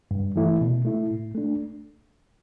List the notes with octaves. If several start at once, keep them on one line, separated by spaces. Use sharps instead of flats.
G2
E3 A3 E4
B2
A3 E4
A2
A3 D4